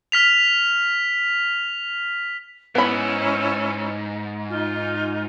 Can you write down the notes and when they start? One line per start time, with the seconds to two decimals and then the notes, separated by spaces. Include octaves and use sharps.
0.12 F6 B6 F7
2.75 G#2 B3 C#4 E4 B5
4.49 D#4 F4